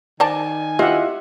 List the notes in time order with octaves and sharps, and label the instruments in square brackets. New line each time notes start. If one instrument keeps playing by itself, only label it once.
[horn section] D#3 G#5 [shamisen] C5 D#5 A5 [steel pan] D5
[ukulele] E4 F4 D#5 [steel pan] G4 E5 F#5 [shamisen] C5